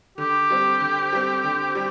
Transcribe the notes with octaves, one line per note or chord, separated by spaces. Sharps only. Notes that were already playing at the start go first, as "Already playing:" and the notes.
D3 G4
G3 C4
D3
G3 C4
D3
G3